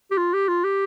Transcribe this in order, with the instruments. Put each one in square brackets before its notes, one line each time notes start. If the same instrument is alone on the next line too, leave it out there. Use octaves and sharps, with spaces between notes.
[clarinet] G4
F4
G4
F4
G4